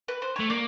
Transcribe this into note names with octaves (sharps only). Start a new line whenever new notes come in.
B4
C5
A3 C#5
A#3 D5